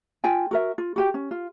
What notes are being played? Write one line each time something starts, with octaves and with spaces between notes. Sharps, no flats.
F4 G5 G#5
F#4 A#4 E5
F4
F#4 G4 G5
C#4
F4